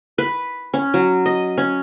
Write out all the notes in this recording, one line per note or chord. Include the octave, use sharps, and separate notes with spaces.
B4
C#4
F#3
D#5
C#4